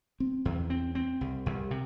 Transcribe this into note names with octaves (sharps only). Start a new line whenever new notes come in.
C4
E2
C4
C4
C2
C2
C3